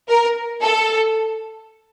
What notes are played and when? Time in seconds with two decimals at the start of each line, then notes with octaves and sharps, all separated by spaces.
0.08 A#4
0.62 A4